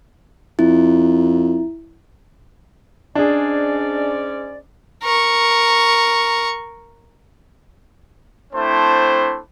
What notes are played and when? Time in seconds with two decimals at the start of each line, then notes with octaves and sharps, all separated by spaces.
0.59 F2 E4
3.15 G#2 C#4 D4 G#4 D5
5.03 A#4 C#6
8.53 A3 C4 D4 E4 C5